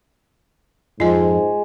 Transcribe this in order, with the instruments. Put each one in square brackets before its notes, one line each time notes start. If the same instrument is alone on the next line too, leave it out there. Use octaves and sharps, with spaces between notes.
[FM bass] F2 [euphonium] G#2 [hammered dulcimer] G#3 [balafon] F4 D#5